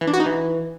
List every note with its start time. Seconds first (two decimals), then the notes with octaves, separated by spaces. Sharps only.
0.01 E3
0.07 D4
0.14 F#4
0.20 D#4
0.26 E3